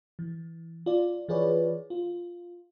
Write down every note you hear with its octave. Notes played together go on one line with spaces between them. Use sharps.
E3
F4 D5
E3 F4 G#4 B4 C#5 D5
F4